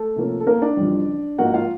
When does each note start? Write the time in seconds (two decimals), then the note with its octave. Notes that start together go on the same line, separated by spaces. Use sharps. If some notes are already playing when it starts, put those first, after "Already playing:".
Already playing: A3 A4
0.16 C3 F3 A#3 C#4
0.40 A4
0.47 A#3 A#4
0.62 D4 D5
0.77 F2 C#3 E3 G3
1.38 G#2 F3 A#3 F#4 F#5
1.54 F4 F5